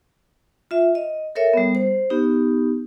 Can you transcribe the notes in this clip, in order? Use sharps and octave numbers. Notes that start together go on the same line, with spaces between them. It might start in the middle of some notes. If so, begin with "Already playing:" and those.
F4 E5
D#5
A4 A#4 C#5 E5
G3 B3
C5
B3 D#4 G4